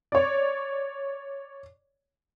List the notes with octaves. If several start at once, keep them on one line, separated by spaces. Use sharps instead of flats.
C#5 D5